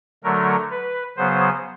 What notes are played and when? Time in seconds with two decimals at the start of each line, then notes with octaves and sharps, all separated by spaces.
0.24 D3 F#3 A3 A#4
0.71 B4
1.17 C#3 F#3 B3 C5